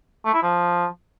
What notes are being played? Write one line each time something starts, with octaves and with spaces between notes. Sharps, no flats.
A3
E4
F3